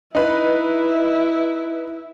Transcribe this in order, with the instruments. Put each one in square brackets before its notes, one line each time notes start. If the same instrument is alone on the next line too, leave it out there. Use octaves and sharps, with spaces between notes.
[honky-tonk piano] D#4 B4 [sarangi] E4